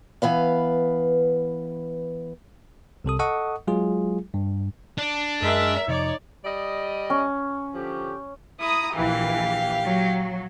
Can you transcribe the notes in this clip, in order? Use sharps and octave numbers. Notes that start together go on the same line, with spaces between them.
E3 B3 B4 F5
C2 C3 A4 D#6
A4 D#5 F#5 C#6 D#6
F#3 G#3 F4 G#4
G2
D4
F#2 G#3 A#4 E5
F2 C3 F3 D#4 C#5 D5
G3 D5 D#5
C#4
D3 F3 G4
E4 A#5 D#6
A#1 E3 G4 F5
F#3